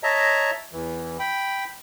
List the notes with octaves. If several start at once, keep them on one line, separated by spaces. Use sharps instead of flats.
C#5 D#5 E5 A5 A#5
E2 E3
G5 B5